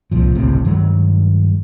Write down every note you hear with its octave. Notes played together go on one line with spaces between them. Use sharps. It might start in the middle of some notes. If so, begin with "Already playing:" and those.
C2 A#2 F3
G#1 C#2 A2 C3
G2 D#3 F#3 G#3